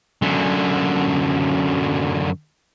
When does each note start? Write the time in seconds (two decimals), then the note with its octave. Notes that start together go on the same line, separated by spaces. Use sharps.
0.22 F#2 D3